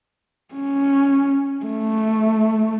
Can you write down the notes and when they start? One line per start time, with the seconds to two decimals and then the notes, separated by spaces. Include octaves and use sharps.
0.54 C#4
1.65 A3